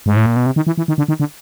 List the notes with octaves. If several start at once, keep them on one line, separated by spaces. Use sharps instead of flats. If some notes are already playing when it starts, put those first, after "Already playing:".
G#2
A2
A#2
B2
C3
D#3
E3
E3
D#3
D3
D#3
D3